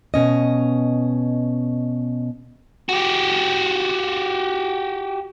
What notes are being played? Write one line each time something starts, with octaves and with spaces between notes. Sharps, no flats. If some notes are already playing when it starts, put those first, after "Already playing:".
B2 C#4 D#5
F#4 G4